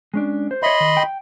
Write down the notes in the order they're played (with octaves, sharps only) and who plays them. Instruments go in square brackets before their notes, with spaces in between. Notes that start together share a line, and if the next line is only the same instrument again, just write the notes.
[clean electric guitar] G#3 C#4 D4
C5
[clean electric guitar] C#5 E5 [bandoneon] D#5 B5 C6
[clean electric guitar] D#3
G5